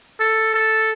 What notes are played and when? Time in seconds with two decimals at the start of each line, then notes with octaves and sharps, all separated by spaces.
0.20 A4
0.54 A4